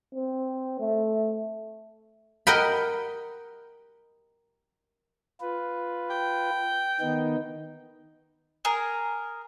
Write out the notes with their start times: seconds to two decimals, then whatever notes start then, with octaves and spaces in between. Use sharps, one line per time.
0.15 C4
0.80 A3
2.47 A#4 D#5 F#5 G5 B5
5.41 F4 B4
6.10 G5
7.01 D#3 B3 D#4
8.65 G#4 A#4